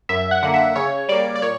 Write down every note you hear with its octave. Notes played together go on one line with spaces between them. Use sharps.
F#2 E5
F#5
D3 A#3 F#5
E5
C#3 C#5
G3 A#3 D5
D5
A#2 C#5